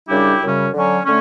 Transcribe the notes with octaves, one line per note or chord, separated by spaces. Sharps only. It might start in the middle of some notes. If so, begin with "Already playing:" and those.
F#2 C#3 G3 D4 E4 G4
F#2 C#3 G3 C#4
D3 F#3 C#4
D3 A3 C#4